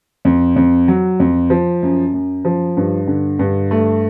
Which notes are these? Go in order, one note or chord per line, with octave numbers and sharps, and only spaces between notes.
F2
F2
F#3
F2
F3
F#2
F#2
F3
G2
D3
G2
A3